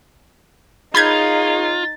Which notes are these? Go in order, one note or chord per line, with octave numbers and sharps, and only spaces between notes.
D#4 F4 G#4 A#4 C#5 B5 G6 G#6